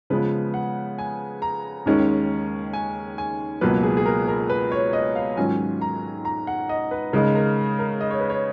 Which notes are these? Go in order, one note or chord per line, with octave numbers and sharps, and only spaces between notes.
C#3 F3 G#3 B3 B4
F#5
G#5
A#5
D#2 D#3 G#3 C#4
G#5
G#5
C#2 B2 F#3 A#3 B4
G#4
G#4
A#4
A#4
B4
C#5
D#5
F5
G#2 D#3 F#3 C#4 F4 G#5
A#5
A#5
F#5
D#5
B4
C#3 G#3 D#4 A#4
A#4
A#4
D#5
C#5
B4
C#5